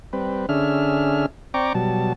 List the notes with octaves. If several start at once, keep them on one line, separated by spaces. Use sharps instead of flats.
G3 C4 B4
D3 C#4 D4 G#4 E5 F6
C4 D5 G5 A#5 C#6 D6
B2 F#3 G3 A5